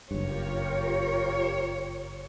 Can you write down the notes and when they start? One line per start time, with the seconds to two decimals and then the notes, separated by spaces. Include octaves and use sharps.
0.11 F#1 G2 F4 G4 A#4 C#5